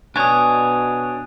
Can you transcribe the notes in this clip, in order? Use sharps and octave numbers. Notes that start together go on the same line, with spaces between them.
B2 D4 C#5 G#5 D#6